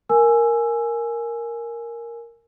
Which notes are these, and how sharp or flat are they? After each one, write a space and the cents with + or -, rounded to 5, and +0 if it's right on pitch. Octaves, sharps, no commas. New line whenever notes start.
A#4 +0 G#5 +5 E6 +10